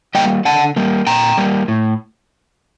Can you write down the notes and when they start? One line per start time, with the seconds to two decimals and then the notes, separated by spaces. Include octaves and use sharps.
0.15 G3 A#3 D#5 G5
0.45 D3 F#5 A5
0.76 G3 A#3
1.07 A#2 G5 A#5
1.38 G3 A#3
1.68 A2